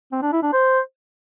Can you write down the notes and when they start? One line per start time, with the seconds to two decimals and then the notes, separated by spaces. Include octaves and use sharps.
0.12 C4
0.22 D4
0.32 E4
0.43 D4
0.53 C5